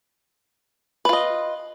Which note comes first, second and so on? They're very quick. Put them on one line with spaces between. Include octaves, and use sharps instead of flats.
B4 F4 D#5